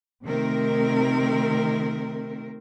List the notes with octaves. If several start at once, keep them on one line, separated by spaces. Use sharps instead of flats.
C3 D#3 A3 C4 A#4